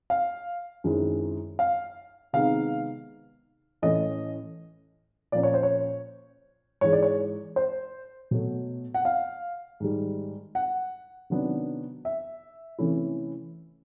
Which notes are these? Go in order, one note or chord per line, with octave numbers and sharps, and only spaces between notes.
F5
F#2 D#3 G#3 C4 E4
F5
C3 D#3 G#3 B3 D#4 F5
A2 E3 A3 C#4 D#5
A#2 F3 A#3 C#4 D5
C#5
C5
C#5
G#2 E3 G#3 C#5
D5
C#5
C5
B2 F#3 A3
F#5
F5
G#2 D#3 G3
F#5
C3 D#3 F#3 B3 D4
E5
C3 E3 A3 C#4 E4